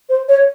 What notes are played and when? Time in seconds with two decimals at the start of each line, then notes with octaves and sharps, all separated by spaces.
0.09 C5
0.29 C#5